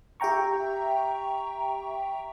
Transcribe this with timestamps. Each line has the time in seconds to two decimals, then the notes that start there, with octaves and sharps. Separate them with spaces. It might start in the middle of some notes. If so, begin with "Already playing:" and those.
0.20 G4 E5 G5 A#5 C#6